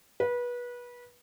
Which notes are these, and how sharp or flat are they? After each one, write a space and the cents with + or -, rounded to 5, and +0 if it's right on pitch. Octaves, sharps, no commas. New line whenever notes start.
B4 -25